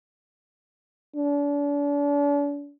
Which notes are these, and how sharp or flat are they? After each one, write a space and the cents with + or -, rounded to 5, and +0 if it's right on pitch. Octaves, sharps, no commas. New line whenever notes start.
D4 -40